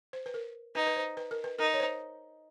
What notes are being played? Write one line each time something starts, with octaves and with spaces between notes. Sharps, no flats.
C5
B4
A#4
D#4 B4
B4
C5
B4
A#4
B4
D#4 A#4
C#5
C5